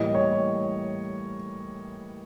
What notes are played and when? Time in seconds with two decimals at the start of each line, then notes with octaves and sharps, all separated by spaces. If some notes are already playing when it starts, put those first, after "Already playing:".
Already playing: A2 E3 G3 A#3 D#5
0.15 C#5